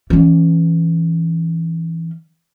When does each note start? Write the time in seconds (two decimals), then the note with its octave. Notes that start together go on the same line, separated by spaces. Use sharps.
0.10 E3 C#4